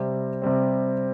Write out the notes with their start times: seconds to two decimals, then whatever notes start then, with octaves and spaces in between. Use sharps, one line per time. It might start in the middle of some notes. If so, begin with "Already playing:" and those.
Already playing: C3 G3 C4
0.42 C3 G3 C4